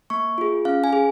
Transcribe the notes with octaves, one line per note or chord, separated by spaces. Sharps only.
A#3 C#6
F4 G#4
C#4 F5
G#5
G#4